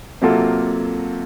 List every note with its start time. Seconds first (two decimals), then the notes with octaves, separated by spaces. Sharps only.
0.22 C3 F#3 A#3 F4 A4